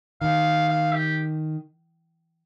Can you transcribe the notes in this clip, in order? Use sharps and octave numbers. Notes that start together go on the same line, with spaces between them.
D#3 F5
F5
G4